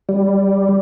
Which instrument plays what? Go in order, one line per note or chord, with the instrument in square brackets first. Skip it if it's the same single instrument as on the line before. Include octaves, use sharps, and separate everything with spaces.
[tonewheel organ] G3